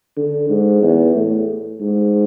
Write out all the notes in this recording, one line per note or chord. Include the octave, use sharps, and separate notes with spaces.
D3
G#2
E2
A2
G#2